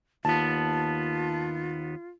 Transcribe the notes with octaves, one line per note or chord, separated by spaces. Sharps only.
D#2 B3 F4 A5